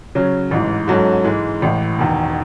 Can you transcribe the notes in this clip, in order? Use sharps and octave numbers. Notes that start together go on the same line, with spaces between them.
C#3 F#3 C#4
A1 G#2 E3
G#2 F#3 C#4 F#4 A4
G#2 E3 G#3
A1 A2 E3
E1 E2 D#3